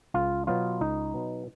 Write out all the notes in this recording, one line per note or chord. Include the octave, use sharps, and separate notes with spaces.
C#2 F4
B2 F#3 B3 F4
C#2 D#4
B2 F#3 B3